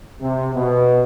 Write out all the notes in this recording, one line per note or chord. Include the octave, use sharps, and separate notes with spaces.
C3
B2